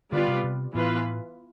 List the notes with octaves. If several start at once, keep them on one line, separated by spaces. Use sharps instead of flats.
D3 G3 B3 F4 B4 D5
C3
C3
A2 E3 B3 F4 B4